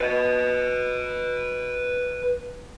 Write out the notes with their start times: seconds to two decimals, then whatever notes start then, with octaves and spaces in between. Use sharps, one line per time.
0.01 B4 D#5